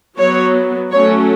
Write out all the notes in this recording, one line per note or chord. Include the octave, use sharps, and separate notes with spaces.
F#3 B3 C#5
F#3 A3 C#4 C#5